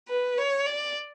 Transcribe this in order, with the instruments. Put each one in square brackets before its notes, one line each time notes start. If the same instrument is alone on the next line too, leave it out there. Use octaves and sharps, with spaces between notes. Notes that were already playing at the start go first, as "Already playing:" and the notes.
[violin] B4
C#5
D5